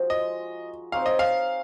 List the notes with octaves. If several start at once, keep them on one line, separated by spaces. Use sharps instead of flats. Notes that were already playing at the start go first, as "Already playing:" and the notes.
Already playing: F3 G#3 D#4 F#4
D#5
C4 D#4 G#4 C#5 F5
D#5
F5